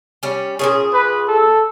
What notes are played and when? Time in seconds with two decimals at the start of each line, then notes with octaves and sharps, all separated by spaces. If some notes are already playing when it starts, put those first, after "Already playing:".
0.23 G3 C#4
0.59 A#2 D#3 C#4 G#4
0.93 B4
1.28 A4